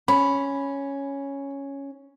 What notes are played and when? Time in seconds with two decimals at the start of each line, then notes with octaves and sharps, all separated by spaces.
0.08 C#4 B5